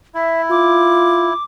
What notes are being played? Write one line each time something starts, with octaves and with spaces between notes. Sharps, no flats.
E4 E5
F4 D6